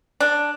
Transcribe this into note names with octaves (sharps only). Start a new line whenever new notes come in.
D4